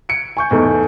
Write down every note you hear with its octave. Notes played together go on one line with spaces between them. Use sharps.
C#7 D7
G#5 C#6 G6
E2 G#2 A3